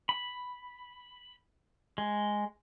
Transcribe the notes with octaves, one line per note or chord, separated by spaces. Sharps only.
B5
G#3